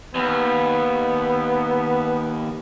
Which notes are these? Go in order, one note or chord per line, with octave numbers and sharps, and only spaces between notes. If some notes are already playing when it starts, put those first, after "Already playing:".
D#2 B3